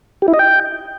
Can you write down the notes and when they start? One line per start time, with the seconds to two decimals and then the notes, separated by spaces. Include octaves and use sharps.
0.22 G4
0.28 E4
0.34 D#5
0.39 G5